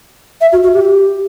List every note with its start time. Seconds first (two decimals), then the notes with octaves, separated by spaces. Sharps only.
0.41 E5
0.52 F#4
0.63 F#4
0.73 G4